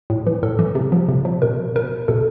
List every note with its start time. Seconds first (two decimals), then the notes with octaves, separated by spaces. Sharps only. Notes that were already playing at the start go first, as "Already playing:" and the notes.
0.10 A2
0.27 E3
0.43 A2 A4
0.59 E3
0.75 C3
0.92 F3
1.09 C3
1.25 F3
1.42 B2 A#4
1.75 B2 A#4
2.08 B2 A4